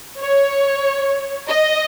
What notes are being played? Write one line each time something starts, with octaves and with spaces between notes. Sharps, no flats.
C#5
D#5